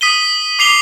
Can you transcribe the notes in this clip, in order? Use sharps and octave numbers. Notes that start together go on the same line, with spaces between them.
D#6 B6 D#7 G7
D6 C7 F7 G7